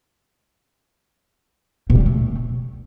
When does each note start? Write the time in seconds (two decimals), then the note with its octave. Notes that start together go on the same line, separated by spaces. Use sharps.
1.90 B2
1.95 G3
2.00 C#3
2.06 A3